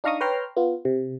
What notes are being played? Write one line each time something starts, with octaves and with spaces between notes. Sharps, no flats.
D4 D#4 F5 A#5 C#6 D#6
B4 C#5 G5 A#5 C6 F6
B3 F4
C3